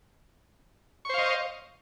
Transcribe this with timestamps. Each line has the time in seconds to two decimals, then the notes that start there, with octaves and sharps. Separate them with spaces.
1.05 C#6
1.09 C5
1.14 F5
1.18 D#5